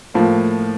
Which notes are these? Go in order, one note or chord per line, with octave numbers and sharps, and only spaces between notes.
A2 F3 A#3